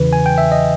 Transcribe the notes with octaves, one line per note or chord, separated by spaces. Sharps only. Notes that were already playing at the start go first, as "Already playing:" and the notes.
Already playing: E2 C#3 E3 B4
G#5
G5
E5
D#5